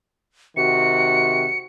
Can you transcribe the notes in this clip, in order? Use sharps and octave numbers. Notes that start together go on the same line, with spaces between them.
C3 D#3 F#4 C#7